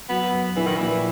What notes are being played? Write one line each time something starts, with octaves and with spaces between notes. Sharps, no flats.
F#3 B3
F#2
A#1 E3
D#3
A#2 E3